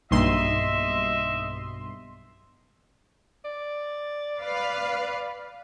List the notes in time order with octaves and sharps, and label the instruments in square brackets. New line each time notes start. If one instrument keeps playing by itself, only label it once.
[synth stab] B1 G2 C6 [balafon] A#3 D#4 [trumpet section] D#5 E5
[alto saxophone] D5
[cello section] B4 F5